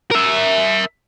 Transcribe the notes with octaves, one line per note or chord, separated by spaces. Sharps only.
A#4 E5